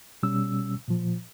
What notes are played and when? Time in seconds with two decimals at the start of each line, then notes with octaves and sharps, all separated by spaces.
0.23 B2 G3 C#4 E6
0.88 A#2 F3